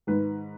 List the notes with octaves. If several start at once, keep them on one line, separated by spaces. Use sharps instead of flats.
G#2 D#3 B4